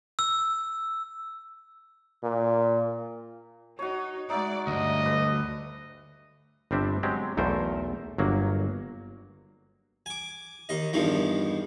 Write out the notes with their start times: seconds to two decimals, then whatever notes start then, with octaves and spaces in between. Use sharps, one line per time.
0.19 E6
2.23 A#2
3.79 D#4 F#4 C#5
4.30 G#3 D#4 D5 E5 F#5
4.67 D2 G2 D#5
5.04 A4 B4 D5
6.71 G1 G3 C4 D4 E5
7.03 F#3 G#3 C4 G4
7.37 B1 E2 A3 A#4 C5
8.18 G1 F#3 A#3
10.06 G#5 D6
10.69 D#2 D#5
10.93 E2 G2 D#3 F3